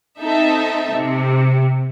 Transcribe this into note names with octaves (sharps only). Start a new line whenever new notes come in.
C4 D#4 A4 E5
C3